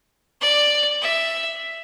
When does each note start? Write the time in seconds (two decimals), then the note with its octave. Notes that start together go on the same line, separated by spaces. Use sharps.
0.41 D5
1.01 E5